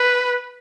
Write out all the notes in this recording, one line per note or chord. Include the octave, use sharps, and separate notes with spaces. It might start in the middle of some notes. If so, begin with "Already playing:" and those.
Already playing: B4